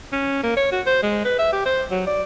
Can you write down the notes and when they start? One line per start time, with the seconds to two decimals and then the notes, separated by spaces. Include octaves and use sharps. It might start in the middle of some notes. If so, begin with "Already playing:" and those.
0.13 C#4
0.43 A#3
0.57 C#5
0.72 F#4
0.86 C5
1.03 G#3
1.25 B4
1.38 E5
1.53 G4
1.66 C5
1.91 F#3
2.07 D5